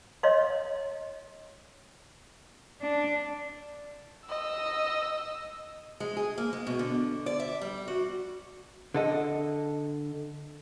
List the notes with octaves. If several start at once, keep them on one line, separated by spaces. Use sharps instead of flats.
C#5 D#5 F5 C6
D4
D#5 E6
G#3
G#4
A#3
G#3
B2
D3
D5
E5
G3
F#4
D3 A4 D#5